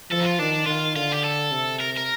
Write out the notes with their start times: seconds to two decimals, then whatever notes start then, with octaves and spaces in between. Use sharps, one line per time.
0.11 F3 A4
0.21 D#4
0.25 F4
0.39 D#3 D4
0.67 D#3 F4
0.96 D3 F4
1.12 G4
1.24 A4
1.52 C3
1.80 A#4
1.97 A#4